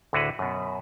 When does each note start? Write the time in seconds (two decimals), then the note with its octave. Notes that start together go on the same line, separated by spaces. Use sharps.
0.13 D2 A2 D3 F#4 G#4 B4
0.39 F#2 B2